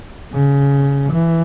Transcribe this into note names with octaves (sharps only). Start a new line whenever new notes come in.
C#3
E3